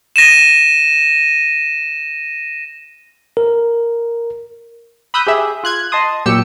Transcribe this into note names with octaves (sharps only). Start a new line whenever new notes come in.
A#6 D#7 E7
A#4
B5 D#6 E6 F#6 G6
G4 G#4 E5
F4 F#6 G#6
D#5 A5 C6 D#6
A#2 F#3 G4 E6 C#7